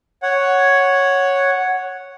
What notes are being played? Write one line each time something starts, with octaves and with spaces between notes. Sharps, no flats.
C#5 F#5